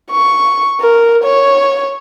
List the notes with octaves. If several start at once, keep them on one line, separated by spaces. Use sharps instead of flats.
C#6
A#4
C#5